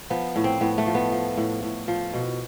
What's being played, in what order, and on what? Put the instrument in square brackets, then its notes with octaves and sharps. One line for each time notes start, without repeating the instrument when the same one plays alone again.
[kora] F3 B3
A2
C4
A2 B3
A3
F3
B3
F3
A2
A2
F3
B2